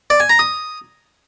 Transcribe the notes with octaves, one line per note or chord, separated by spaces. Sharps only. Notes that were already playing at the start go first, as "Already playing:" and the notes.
D5
G#5
A#5
D#6